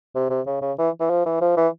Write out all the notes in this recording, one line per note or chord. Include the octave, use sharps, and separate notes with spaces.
C3
C3
C#3
C#3
E3
E3
F3
E3
F3
E3